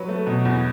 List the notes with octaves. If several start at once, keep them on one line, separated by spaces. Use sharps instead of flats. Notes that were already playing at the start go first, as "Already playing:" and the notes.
Already playing: F#3 B4
A3
B2
E2